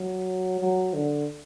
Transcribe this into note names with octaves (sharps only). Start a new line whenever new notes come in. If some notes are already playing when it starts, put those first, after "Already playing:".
Already playing: F#3
F#3
D3